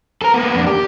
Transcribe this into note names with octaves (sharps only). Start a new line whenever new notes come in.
A4 A#4
A#3 B3
F2 D4
G4